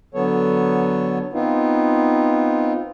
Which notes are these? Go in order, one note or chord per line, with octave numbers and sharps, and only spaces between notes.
D3 F#3 B3 A4 C#5
B3 C4 D#4 F4